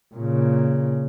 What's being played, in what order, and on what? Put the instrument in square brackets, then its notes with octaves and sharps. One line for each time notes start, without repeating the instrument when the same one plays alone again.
[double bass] A#2 C#3